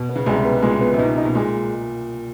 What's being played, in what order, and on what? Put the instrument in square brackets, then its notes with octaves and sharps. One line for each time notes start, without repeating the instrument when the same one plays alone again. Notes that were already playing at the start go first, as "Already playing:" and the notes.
Already playing: [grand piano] B2
[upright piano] B3
[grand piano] C#3
[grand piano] C2 C3 [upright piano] G#3
[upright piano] B3
[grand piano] A#2 [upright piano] G#3
[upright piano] B3
[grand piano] C3
[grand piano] B2 [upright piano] D#4
[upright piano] D#4
[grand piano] B2
[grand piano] A#2 [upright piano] G#3